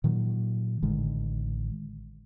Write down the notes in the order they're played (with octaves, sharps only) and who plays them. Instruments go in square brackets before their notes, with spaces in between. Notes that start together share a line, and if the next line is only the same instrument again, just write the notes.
[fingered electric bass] A#2 D#3 F#3
A1 D3 D#3 G#3